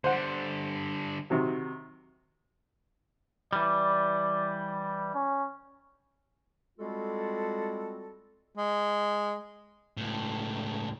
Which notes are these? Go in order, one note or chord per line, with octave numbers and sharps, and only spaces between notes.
D3 G3 C5 F#5
C3 D#3 F#3
E3 G3 D5
C#4
G3 G#3 C4 F4 F#4 A4
G#3
C#2 A2